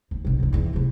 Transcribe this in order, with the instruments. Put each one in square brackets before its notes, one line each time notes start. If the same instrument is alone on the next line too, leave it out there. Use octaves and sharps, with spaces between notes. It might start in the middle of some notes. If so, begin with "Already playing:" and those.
[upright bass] D2
F1 A#1
A1 D3
E2 E3
E2 C3